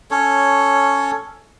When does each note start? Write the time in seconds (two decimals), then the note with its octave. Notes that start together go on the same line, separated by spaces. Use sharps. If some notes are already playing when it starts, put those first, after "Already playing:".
0.11 C#4 A4 C#5